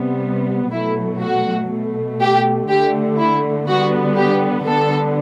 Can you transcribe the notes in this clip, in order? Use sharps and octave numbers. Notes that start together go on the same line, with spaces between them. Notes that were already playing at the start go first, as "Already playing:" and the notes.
Already playing: C3 G3 B3
B2 F#3 A3 E4
F#4
B2 A3
G4
D3 A3 G4
E4
D3 G3 B3 F#4
G4
D3 G3 B3 A4